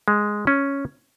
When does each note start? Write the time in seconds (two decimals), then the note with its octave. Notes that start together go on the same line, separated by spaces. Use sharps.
0.08 G#3
0.47 C#4